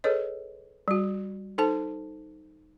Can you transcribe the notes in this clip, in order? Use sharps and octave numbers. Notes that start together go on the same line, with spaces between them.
G#4 A4 B4 C#5 D#5
G3 F#4
D#4 A4 C5 A5